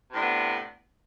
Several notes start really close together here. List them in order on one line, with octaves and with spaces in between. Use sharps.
C3 A2 D4 B3